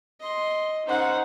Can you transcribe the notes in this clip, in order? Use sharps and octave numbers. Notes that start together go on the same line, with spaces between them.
D#5 C6
C#4 D#4 C5 F#5